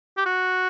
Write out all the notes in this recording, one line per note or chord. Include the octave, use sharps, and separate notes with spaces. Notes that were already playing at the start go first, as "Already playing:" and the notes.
G4
F#4